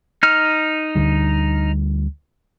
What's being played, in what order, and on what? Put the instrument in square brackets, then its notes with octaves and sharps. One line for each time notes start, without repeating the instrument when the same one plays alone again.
[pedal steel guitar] D#4 F6
[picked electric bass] D2 D3 G3